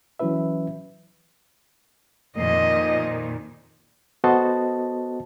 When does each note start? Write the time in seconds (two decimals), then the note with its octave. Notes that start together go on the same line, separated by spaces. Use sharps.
0.19 E3 F#3 C#4 E4 B4 E5
2.38 F2 A#2 D#3 D#5
4.24 B3 F#4 A4 C5 D#5 A5